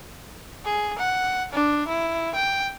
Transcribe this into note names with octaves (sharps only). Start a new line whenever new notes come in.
G#4
F#5
D4
E4
G5